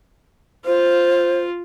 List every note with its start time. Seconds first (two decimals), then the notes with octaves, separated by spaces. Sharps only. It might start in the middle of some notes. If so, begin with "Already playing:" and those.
0.66 F4 C5